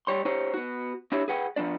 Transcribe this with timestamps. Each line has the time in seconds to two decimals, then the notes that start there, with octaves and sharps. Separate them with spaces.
0.07 G3 C#5 C6
0.25 D#4 G4 C5 C#5
0.54 B3 F#4
1.12 D4 E4 G4 C#5
1.28 G#4 B4 F#5 G5
1.56 F3 A#3 B3 D4 D5